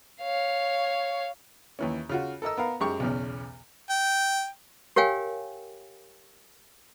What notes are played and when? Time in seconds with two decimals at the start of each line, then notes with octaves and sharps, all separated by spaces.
0.21 C#5 F5
1.79 D#2 E3 C#4
2.09 C#3 F4 F#4
2.42 A4 A#4 D#5 E6
2.57 B3 A#4 F5
2.80 F#2 G#3 G4 C#6
3.00 B1 E2 C#3
3.90 G5
4.96 G4 A#4 C#5 F5 G5 G#5